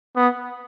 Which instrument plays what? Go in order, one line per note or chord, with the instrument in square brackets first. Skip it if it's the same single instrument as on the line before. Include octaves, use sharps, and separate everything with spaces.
[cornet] B3 [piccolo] D#6